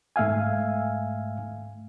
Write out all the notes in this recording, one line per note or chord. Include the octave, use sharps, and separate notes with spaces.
G#2 A3 E5 F5 G#5